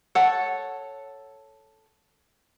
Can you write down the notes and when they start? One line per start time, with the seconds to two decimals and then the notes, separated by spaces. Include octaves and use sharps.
0.15 A4 C#5 F#5